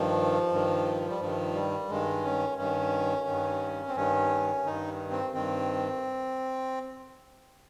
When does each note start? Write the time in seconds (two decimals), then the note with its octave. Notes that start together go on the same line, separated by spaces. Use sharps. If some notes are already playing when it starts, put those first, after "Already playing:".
Already playing: G2 D#3 F3
0.52 G2 D#3
1.09 G3
1.20 G2 D#3 F3
1.55 G3
1.89 G2 D#3 G#3
2.24 C#4
2.58 G2 D#3 C#4
3.27 G2 D#3
3.88 C4
3.96 G2 D#3 C#4
4.65 G2 D#3 D#4
5.11 C4
5.34 G2 D#3 C4